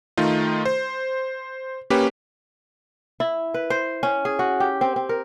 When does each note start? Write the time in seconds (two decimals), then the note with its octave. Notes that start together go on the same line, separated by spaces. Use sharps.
0.17 D#3 A3 D#4 F4
0.65 C5
1.90 A#3 C#4 G4 B4
3.20 E4
3.54 B4
3.70 C5
4.03 C#4
4.25 G#4
4.39 F#4
4.60 G4
4.81 C4
4.96 C4
5.09 A#4